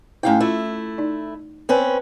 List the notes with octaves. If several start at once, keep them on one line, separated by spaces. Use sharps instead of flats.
G#2 A3 C#4 E4 F5 G5
A3 E4 F4
D#4 D5
C4 C#4 B4